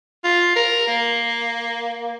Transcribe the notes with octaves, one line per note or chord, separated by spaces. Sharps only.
F4
A#4
A#3